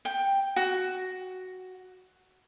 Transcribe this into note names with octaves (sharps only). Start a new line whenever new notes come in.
G5
F#4